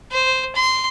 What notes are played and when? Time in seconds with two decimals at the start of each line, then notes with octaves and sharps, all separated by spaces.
0.12 C5
0.56 C6